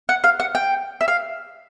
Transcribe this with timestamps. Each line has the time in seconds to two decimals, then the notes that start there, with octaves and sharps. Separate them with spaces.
0.09 F#5
0.24 F5
0.40 F#5
0.55 G5
1.01 E5
1.08 F5